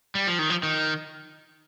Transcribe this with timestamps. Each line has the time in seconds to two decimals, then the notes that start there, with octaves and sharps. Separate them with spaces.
0.15 G3
0.27 F3
0.39 D#3
0.50 F3
0.63 D#3